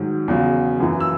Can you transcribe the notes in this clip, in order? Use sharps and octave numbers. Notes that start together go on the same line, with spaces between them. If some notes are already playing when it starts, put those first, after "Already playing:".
Already playing: G#2 D#3 F#3
E2 C#3 F#3
F#2 E3
E6